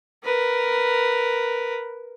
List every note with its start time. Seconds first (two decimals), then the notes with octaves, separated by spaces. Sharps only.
0.24 A#4 B4